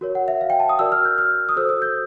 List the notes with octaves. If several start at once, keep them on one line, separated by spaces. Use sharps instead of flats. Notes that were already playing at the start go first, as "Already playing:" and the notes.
F#4 A#4 C#5
F#5
E5
F5
G5
A5
D#6
F#4 A#4 D5 E6
F6
G6
F6
D#6
F#4 A4 C5 E6
D#6
G6